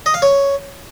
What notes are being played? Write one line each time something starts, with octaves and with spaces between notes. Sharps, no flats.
D#5
F5
C#5